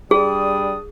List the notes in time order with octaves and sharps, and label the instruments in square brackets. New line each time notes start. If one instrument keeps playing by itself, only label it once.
[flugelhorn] G3 [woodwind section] D4 D#6 [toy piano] G#4